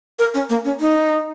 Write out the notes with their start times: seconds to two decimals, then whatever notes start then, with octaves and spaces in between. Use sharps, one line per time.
0.19 A#4
0.34 C#4
0.49 A#3
0.65 C#4
0.80 D#4